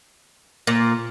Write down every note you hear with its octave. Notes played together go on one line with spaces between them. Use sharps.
A#2